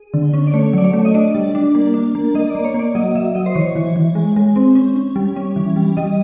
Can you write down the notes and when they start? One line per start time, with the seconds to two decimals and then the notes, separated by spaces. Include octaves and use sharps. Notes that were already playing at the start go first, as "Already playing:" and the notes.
Already playing: G#4
0.14 D3
0.34 C#4
0.47 D5
0.54 A3 C#5
0.73 F#3 D5
0.84 C#5
0.93 A3
1.05 D#5
1.14 D4 D5
1.35 G3
1.55 D4
1.75 A#3
1.94 D4
2.15 A#3
2.35 A#3 D#5
2.50 A#3 D5
2.64 C#5
2.74 A#3
2.79 D5
2.95 F#3 D#5
3.15 F#3 E5
3.35 F#3 D#5
3.46 C5
3.55 E3 C#5
3.75 E3
3.96 E3
4.15 G#3
4.36 G#3
4.56 C4
4.75 C#4
4.96 C#4
5.16 G3
5.36 C#4
5.56 E3
5.76 G3
5.97 G3 D#5